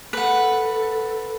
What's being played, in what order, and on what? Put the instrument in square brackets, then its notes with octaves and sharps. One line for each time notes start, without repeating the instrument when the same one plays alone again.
[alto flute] A4 [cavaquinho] B4 F#5